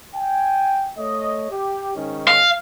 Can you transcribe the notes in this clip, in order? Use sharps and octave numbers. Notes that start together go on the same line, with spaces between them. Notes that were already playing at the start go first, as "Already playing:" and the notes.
G5 G#5
A3 C#5 D#5
G4
G#2 D#3 C#4
F5